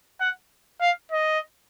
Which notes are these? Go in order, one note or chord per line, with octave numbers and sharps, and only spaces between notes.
F#5
F5
D#5